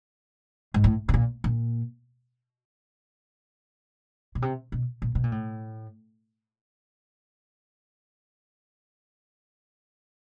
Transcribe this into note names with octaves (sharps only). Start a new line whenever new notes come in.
G#2
A2
B2
A#2
A#2
B2
C3
B2
A#2
B2
A#2
A2